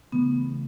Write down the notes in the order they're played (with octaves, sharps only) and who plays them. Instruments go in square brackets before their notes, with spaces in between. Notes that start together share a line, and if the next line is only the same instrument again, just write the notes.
[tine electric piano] C#3 E3 A3 [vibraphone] B3